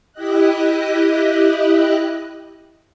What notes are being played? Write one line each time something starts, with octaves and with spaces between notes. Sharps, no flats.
E4 G4 D#5 F#6